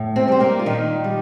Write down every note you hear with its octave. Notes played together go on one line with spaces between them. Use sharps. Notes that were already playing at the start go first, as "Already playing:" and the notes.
Already playing: A2
C3 C4
G3 C5
A#3 A#4
F4
A#2 D#3 D#4
G3